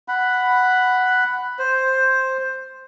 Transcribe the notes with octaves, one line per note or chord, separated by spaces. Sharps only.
F#5 B5
C5